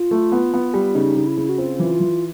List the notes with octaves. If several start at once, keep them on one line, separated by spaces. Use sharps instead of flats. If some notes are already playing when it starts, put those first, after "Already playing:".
Already playing: F4
A3
B3
B3
G3
C#3 D#4
C#3
E4
C#3
F#4
C4 F4
E3
E3